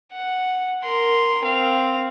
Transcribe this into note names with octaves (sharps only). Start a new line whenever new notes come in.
F#5
A#4 C6
C4 F5